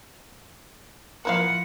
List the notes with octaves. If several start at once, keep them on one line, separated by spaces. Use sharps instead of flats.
F3 A#3 E4 F5 F#5